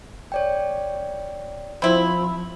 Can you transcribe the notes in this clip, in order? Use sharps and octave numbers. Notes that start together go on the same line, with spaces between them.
C#5 D5 G5
F3 C4 E4 B5